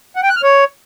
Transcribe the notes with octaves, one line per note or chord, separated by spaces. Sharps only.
F#5
G5
F#6
F6
C#5